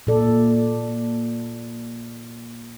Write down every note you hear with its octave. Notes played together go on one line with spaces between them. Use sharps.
A#2 A#3 A4 D5